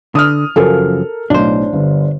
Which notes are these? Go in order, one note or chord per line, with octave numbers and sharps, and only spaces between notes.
D3 D#6 F6
F#2 C#3 F3 A4 A#4
B1 A2 D4 C5
G1